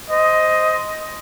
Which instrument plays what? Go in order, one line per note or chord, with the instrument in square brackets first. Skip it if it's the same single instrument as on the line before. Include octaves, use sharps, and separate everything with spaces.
[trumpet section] C5 D#5